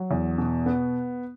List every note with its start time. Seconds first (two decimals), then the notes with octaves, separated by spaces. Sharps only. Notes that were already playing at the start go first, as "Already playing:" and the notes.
Already playing: F#3
0.11 E2
0.38 B2
0.66 B3